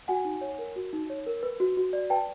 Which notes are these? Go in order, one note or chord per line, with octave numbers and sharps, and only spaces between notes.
F#4 F#5 G#5
D#4
C#5
A#4
F#4
D#4
C#5
A#4
B4
F#4
F#4
D5
B4 G5 A5